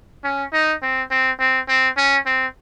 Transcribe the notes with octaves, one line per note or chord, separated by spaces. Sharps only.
C#4
D#4
C4
C4
C4
C4
C#4
C4